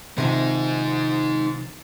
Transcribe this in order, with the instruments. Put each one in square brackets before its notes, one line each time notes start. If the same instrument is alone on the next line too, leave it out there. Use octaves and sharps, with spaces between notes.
[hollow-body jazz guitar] C3 D#3 F3 [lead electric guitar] D#4 G#4